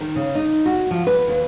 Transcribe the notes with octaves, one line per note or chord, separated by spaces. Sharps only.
D#3
C#3
D#4
F#4
F3
B4
D#2